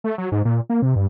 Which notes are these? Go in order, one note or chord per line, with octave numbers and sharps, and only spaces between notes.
A3
F#3
G#2
A#2
A#3
C3
G2